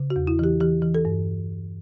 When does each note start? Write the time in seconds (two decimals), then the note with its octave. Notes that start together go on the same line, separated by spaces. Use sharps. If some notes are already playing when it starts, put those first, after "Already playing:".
Already playing: C#3
0.10 F#4
0.16 E2
0.27 E4
0.39 E3 G4
0.61 E3 G4
0.82 E3
0.94 A4
1.05 G2